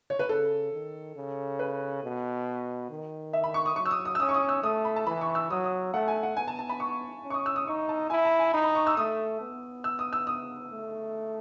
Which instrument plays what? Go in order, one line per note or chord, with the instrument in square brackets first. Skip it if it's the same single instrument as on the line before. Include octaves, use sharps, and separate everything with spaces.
[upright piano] C#5
B4
[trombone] C#3 [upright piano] A4
[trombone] D#3
C#3
[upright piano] B4
[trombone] B2
D#3
[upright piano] E5
B5
C#6
D#6
[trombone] F#3 [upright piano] C#6
[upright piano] E6
D#6
D#6
E6
[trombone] C#4 [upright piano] D#6
[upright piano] C#6
D#6
E6
[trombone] A3 [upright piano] D#6
[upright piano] B5
A5
[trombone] E3 [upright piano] B5
[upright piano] C#6
E6
[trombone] F#3 [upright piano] D#6
[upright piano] D#6
[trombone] A3 [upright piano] F#5
[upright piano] G#5
F#5
[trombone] B3 [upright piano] G#5
[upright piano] A5
A5
B5
C#6
[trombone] C#4
[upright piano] C#6
D#6
E6
D#6
[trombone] D#4 [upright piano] C#6
[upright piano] A5
[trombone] E4 [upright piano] G#5
[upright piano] A5
G#5
[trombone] D#4 [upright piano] B5
[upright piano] B5
C#6
E6
[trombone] A3 [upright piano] D#6
[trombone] B3
[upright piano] E6
D#6
E6
D#6
[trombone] A3